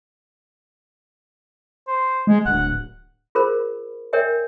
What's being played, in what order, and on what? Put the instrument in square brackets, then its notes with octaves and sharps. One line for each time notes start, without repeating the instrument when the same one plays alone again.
[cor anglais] C5
[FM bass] G#3
[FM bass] D1 [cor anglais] F#5
[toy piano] F4 G#4 A#4 C5 B5
A#4 C#5 D5 E5 G5 G#5